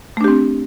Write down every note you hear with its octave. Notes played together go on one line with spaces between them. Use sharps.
A3 C4 D4 G4